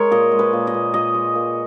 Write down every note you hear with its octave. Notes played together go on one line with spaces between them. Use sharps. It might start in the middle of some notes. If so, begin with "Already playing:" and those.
Already playing: G#3 A#4 C#5
A#2 D#5
G#3
B4
A#2
D#5
A#2
A#2 D#5
G#3
A#2